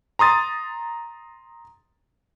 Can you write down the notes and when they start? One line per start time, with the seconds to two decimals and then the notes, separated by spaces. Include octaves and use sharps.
0.19 A#5 C6 D#6 A6